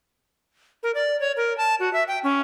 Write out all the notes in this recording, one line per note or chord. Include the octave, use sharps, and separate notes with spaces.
A#4
D5
C#5
A#4
A5
F#4
E5
G5
C#4